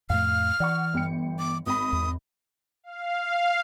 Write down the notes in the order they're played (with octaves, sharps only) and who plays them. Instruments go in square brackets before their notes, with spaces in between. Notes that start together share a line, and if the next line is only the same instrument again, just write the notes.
[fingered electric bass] F2 A2 A3 [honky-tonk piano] F5 [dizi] F6
[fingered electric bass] E3 [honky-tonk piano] D5 F#5 C#6
[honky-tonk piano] G1 G5 C#7
[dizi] D6
[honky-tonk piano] G#1 B5 [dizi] D#6
[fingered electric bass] E2
[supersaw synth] F5